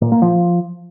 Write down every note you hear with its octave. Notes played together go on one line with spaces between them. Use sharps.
A#2
A#3
F3